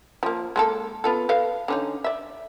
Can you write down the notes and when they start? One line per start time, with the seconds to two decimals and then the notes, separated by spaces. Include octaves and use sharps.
0.23 F3 A#3
0.56 G#3 A#3 A4
1.04 B3 F4 A4
1.29 A4 B4 F5
1.68 D3 C#4 D#4
2.04 D5 E5